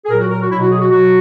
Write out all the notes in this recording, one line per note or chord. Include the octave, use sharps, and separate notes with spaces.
G#4
A#2 F#3 A#4
F#4
A#4
F#4
B2 F#3 E4
F#4
G#4
F#4
B2 F#3 F#4